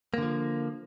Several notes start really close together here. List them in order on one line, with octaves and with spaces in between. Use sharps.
A#3 D3 F3